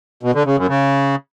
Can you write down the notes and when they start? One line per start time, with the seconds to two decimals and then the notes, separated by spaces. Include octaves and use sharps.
0.23 B2
0.34 D3
0.46 C#3
0.57 F#2
0.69 C#3